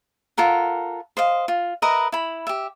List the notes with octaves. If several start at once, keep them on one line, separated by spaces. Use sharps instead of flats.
F4 A4 A#4 F#5
C5 D#5 F5
F4
A#4 B4 D#5 E5
E4 B5
G4 E5